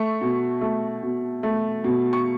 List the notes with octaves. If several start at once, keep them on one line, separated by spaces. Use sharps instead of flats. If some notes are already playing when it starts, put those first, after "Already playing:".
Already playing: A3 C#6
B2
A3
B2
A3
B2
C#6